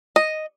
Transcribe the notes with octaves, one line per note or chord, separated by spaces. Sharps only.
D#5